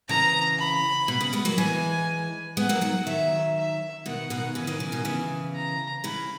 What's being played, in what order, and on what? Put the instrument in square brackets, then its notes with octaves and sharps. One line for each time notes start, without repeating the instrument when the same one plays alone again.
[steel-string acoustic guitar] C#3 E3 [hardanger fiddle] A#5
[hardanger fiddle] B5
[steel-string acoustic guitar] B2
C#3
G#3 B3
F#3 A#3
[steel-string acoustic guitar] E3 G#3 [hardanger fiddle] G#5
[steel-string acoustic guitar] G#3 B3 [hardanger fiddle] F#5
[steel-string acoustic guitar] F#3 A#3
D#3 F#3
[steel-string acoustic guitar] D#3 F#3 [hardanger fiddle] E5
[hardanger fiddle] E5
[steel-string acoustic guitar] B2 D#3 [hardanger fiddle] F#5
[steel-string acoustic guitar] B2 D#3
[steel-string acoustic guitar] C#3 E3 [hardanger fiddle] G#5
[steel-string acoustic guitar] D#3 F#3
C#3 E3
B2 D#3
C#3 E3
[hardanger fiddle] A#5
[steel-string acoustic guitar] C#3 E3 [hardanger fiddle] B5